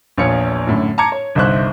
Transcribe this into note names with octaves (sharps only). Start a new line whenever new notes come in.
A#1 E2 F3 F4 C#5 C#7
F#2 A2 D3
A5 A#5 D6 G#6 C#7
C#5
G1 C2 D#4 C5 E5 F#6